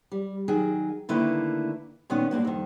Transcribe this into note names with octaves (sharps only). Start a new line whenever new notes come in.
G3
D#3 F#3 G#4
D3 D#3 A3 A#3 E4 B4
A#2 D#3 B3 C#4 B4
G2 B2 A#3 F#4
F2 D#3